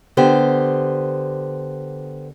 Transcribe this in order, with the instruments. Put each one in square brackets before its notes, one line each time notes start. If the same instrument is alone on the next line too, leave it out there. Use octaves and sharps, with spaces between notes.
[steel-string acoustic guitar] D3 B3 G4 C5